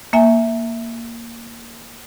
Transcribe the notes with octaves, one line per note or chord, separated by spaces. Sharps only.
A#3 E5 G#5